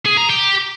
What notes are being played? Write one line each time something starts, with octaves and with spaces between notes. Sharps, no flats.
G#4
A#5
G4